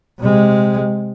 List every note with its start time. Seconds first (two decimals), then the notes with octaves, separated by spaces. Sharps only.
0.20 C3 G#3